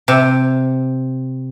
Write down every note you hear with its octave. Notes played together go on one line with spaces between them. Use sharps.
C3